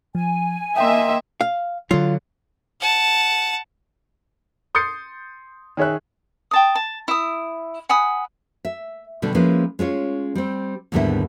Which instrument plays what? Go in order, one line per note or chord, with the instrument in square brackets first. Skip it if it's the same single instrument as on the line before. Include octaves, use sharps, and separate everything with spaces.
[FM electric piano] F3 [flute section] G#5
[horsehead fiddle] A#3 D#5 [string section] E5 [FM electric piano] G5 C6
[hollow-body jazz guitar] F5
[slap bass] D3 F#3 [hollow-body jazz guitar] F4
[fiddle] F#5 A5
[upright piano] C6 D#6 G6 A6 C7 C#7
D#3 G#4 C#5 E5 F#6
[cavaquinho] G5 A5 D#6
A5
E4 D#6
F#5 G#5 B5 D#6
[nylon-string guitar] E5
B2 D3 G3 D4
F3 G#3 A#3 C#4 E4 B4
G#3 C#4 F4 C#5
G3 C4
D#2 G#2 D3 G3 B3 E4